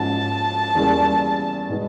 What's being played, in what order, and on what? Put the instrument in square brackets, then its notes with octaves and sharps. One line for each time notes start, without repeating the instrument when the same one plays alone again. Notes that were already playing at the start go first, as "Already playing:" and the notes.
Already playing: [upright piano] G#2 F3 A#3 C#4 F#4 [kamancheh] A5
[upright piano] E2 C#3 E3 G3 A#3
B2 G#3 B3 D#4